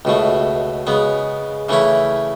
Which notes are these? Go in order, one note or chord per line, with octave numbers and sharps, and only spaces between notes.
C#2 B2 A3
C#3 G#3 B3
C#3 E3 A3 C#4 E4